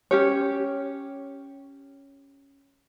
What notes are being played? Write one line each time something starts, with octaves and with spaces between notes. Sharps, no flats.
C#4 G4 C#5